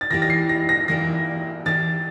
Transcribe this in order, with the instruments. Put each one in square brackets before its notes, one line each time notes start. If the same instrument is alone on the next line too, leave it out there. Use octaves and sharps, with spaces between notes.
[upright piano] A6
[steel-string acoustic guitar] E3 A#3 E4 G4 [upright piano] A#6
[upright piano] A#6
C7
A#6
A#6
[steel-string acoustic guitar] E3 A#3 E4 G4 [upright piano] A#6
[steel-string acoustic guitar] E3 A#3 E4 G4 [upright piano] A6